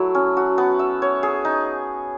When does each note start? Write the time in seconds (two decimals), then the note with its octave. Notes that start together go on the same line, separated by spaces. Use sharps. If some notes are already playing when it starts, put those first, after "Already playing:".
Already playing: F#3 A3 E4 F#4
0.15 C#4
0.37 F#4
0.58 B3
0.79 E5
1.02 C#5
1.23 G#4
1.45 D#4